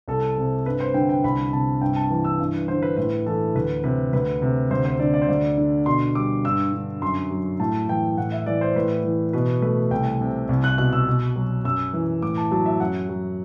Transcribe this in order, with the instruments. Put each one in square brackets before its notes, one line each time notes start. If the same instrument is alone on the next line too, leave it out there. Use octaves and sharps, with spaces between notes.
[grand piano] C2 A4
C3
G2 B4
C5
D3 G5
G5
C2 B5
C3 A5
G2 G5
A5
E3
E6
G2
D3 C5
B4
A2 B4
E3 A4
D2 B4
C3 B4
D2 B4
C3
D2 C5
C5
D3 D5
D5
C5
D2 D5
D3
B2 C6
G3 D6
G2 E6
D3
F#2 C6
F#3
A2 A5
E3 G5
A2 F#5
E5
E3 D5
C5
A2 B4
E3
B2 B4
A3 B4
C2 G5
C3
C2
F#6
B2 F#6
E6
B2
F#3
F#2 E6
E3
A2 D6
A5
F#3 A5
E5
F#2 F#5
F#3